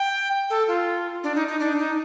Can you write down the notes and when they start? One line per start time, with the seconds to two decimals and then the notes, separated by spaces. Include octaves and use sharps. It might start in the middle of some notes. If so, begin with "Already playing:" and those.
Already playing: G5
0.50 A4
0.68 F4
1.24 D4
1.35 D#4
1.48 D#4
1.60 D4
1.78 D#4